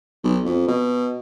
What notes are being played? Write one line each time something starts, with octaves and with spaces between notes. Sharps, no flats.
B1
F2
B2